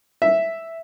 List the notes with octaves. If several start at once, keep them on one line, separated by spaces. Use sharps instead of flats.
E5